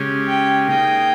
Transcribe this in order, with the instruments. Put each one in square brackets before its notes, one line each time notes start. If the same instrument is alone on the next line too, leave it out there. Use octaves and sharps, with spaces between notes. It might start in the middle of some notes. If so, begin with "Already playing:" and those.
Already playing: [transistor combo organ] C#3 G#3 C#4 G4
[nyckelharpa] G5
[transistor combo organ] A#3 D#4 G#4 D#5 [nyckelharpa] G5